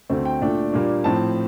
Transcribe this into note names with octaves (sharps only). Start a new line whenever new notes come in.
D2 D3 A3 C4
G5
A#2 A3 D4
A#2 G3 A#3 D4
A2 F3 C4 A5